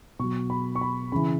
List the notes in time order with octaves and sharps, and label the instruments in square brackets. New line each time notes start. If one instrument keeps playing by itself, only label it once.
[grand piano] B2 F#3 C#6
B5
C#6
B5
C#3 E3 B5